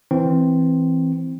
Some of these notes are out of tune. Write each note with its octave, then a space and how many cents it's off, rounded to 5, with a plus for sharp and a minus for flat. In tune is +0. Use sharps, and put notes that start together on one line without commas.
E3 +0 C4 +0